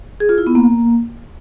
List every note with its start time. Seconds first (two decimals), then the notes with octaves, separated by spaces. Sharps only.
0.20 G#4
0.29 F4
0.38 E4
0.47 B3
0.55 A#3